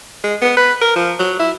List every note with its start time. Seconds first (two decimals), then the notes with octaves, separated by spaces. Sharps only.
0.24 G#3
0.42 B3
0.57 B4
0.81 A#4
0.95 F3
1.19 F#3
1.40 E4